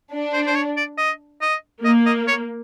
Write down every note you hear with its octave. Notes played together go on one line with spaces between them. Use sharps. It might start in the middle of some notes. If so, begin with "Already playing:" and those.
D4
C5
C5
C#5
D5
D#5
D#5
A#3 D#5
D#5
C#5